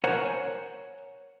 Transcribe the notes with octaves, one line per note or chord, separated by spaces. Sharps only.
A#4 C5 C#5 F#5 G#5 A#5